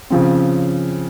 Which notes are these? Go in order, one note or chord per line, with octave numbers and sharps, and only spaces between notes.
C#3 F3 C4